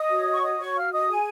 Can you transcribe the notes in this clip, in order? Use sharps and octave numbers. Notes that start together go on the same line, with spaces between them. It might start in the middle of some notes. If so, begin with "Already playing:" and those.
Already playing: D#5 D#6
F#4 C#5
C#6
D#5 D#6
C#5 C#6
F5 F6
D#5 D#6
G#4 G#5